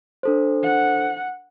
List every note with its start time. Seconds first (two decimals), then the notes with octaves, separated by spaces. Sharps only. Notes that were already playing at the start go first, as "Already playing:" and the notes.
0.23 D4 A4 C5
0.63 F#5